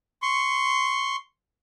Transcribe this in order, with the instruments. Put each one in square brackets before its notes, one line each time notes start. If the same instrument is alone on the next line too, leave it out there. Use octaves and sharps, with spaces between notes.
[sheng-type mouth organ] C6 C#6